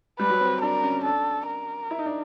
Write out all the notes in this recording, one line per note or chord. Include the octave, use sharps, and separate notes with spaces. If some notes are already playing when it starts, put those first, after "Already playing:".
G3 B4
F#3
C4
D4 A#4
C#4
D4 A4
A#4
E4
D#4
D4